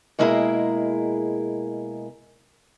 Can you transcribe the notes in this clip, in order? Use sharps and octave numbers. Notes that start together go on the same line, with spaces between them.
B2 G#3 A#3 E4 G#4 A#4